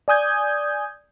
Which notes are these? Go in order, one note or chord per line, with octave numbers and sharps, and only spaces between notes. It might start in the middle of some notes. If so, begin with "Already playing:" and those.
D5 G#5 D#6 G6 G#6